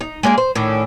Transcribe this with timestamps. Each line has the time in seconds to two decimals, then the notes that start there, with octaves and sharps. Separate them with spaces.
0.01 D#4
0.23 G#3 A#3 D4 G#4
0.38 C5
0.55 A2 D#3 C#4 D4